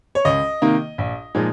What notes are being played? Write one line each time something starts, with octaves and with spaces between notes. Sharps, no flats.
C#5
C#2 D#5
C3 D#3 A#3 D#4
A#1
A#2 F3 G#3 D#4